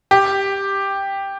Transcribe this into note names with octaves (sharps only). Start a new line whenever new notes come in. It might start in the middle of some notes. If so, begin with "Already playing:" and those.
G4